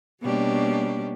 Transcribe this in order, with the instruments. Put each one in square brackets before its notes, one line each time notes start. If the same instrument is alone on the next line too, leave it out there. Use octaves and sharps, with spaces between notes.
[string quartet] B2 G3 A#3 C#4 D4 G4